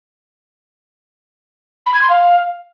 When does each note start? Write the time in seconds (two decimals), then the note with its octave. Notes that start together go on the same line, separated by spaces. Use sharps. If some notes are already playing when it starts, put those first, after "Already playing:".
1.86 B5
1.94 G#6
2.02 C6
2.09 F5